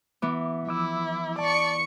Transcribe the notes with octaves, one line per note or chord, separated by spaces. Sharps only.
E3 B3 D6
F3 E4 D6 E6
D5 A5 C#6 C#7